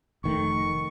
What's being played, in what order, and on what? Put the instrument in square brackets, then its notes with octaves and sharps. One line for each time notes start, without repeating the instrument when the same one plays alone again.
[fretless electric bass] F1 D#3 A3 [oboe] C#6